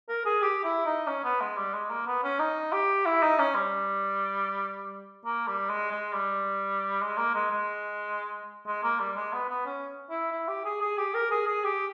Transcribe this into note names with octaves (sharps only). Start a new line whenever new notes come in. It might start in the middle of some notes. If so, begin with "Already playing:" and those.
A#4
G#4
G4
E4
D#4
C#4
B3
G#3
G3
G#3
A#3
B3
C#4
D#4
G4
E4
D#4
C#4
G3
A#3
G3
G#3
G#3
G3
G#3
A#3
G#3
G#3
G#3
A#3
G3
G#3
B3
B3
C#4
E4
E4
G4
G#4
G#4
G4
A#4
G#4
G#4
G4